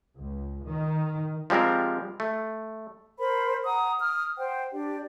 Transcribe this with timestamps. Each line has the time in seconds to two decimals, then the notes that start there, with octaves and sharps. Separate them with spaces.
0.16 C#2
0.66 D#3
1.50 F3 G3 G#3 C4 A#4
2.20 A3
3.19 A#4 C5 B5
3.65 F#5 A#5 D#6
4.00 D#6 F6
4.37 C5 F#5 G5
4.73 D4 G4 D5